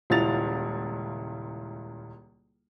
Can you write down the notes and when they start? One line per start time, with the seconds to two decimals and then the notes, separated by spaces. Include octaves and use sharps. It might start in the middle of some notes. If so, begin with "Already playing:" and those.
0.10 D#1 C#2 E4 A6 F7